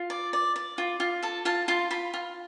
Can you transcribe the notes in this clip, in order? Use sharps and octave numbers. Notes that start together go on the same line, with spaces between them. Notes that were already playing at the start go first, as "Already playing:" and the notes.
Already playing: F4
D5
D5
D5
F4
F4
A4 A5
F4 A5
F4 C6
F4 B5
F4